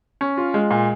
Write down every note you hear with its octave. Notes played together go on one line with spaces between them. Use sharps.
C#4
F4
G#3
A#2